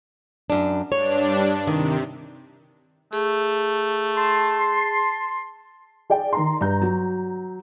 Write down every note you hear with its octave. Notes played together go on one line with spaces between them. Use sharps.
F#2 D4
G2 D4 C#5
C3 D#3
A3 G#4
A5 C6
G#4 D5 G5
D#3 A#5 C6
G2 A#5 G6
F#3